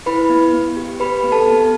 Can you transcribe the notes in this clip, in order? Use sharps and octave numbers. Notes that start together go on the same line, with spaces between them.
E4 B4 B5
B3
B3
G4
G4 B4 B5
B3
A4 A5
B3